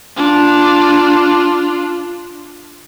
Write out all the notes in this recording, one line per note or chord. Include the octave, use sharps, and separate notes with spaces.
D4 F4